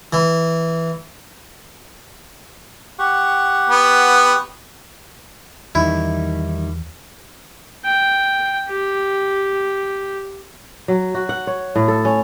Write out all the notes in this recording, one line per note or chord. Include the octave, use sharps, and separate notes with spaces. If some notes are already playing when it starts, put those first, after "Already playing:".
E3
G4 F#5 C#6
B3
E2 D#3 G3 D#4 E4
G5
G4
F#3
F#4
F#5
C#5
A2
A4
C#4